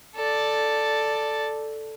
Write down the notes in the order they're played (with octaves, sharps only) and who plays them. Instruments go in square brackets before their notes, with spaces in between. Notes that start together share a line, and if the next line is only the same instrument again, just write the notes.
[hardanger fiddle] A4 D5